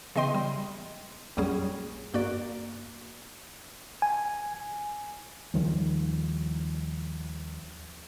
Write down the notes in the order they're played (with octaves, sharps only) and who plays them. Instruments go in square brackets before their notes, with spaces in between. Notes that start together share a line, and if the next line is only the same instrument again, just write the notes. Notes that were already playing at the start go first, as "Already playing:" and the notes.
[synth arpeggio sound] C#3 E3 B3 D#5 G5 C6
G3
A#1 F2 F#3 G3 C#4 G#4
G2 A#3 F#4 D5
[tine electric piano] G#5
[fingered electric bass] D#2 D#3 F3 G3